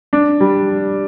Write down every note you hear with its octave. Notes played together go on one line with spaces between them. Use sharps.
D4
G3